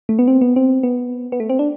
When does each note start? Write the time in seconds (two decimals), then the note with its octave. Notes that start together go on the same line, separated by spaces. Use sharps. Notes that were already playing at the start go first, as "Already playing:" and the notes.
0.09 A3
0.19 B3
0.28 C4
0.41 B3
0.56 C4
0.83 B3
1.32 B3
1.40 A3
1.50 C4
1.59 D4